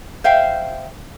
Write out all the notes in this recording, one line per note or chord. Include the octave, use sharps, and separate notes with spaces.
C5 E5 F5 G5